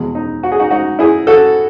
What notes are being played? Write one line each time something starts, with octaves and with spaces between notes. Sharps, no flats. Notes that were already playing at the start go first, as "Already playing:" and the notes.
Already playing: E2 B2 G#3
D#4
F#4
G#4
D#4 F#4
D#4 F#4
E4 G#4
F#4 A4